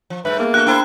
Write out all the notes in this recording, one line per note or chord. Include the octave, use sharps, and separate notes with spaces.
F3
G2 A3 B4 E5
A#3 B3 G#4
D4 F#4 A4 F#6
D4 E4 A4 C5 G5 A#5